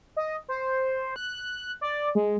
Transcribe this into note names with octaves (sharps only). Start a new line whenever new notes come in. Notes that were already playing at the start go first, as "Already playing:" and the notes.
D#5
C5
F#6
D5
G#3